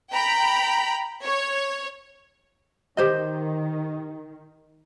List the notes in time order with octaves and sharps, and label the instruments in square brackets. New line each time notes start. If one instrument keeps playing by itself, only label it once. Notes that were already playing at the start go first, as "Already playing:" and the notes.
[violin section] G5 A#5 B5
C#5
[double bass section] D#3 [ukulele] G4 C5 D#5